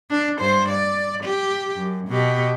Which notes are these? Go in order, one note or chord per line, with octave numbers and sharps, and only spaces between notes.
D4
G2 C5
D5
G4
F#2
B2 G4